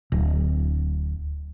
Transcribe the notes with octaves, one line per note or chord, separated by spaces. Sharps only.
D1